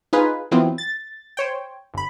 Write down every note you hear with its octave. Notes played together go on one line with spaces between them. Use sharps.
D#4 F4 G#4 B4
E3 F#3 B3 C4 F4
A6
C5 C#5 G5
G1 B5